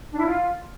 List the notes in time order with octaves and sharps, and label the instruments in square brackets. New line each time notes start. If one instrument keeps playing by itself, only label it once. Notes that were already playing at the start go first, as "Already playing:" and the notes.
[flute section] D4
E4
F4